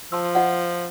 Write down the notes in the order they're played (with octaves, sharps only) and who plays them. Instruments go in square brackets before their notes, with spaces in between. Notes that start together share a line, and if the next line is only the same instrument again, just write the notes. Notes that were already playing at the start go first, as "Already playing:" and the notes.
[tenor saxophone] F3 [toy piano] A5 C6 E6
[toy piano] F4 D#5 F#5